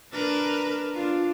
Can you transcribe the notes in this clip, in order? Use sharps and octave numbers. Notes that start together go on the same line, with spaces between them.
D4 A#4 B4
D4 F4